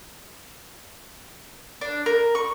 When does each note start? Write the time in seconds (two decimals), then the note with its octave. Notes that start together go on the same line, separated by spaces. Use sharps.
1.81 D4
2.06 A#4
2.35 C#6